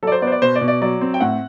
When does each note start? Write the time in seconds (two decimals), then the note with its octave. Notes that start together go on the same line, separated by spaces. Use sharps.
0.03 F#3 A4
0.07 D5
0.12 C5
0.22 B3 D5
0.27 C5
0.32 D5
0.42 B2 C5
0.55 D5
0.61 B2
0.68 D5
0.82 F#3 D5
1.01 C4
1.14 G5
1.20 A2 F#5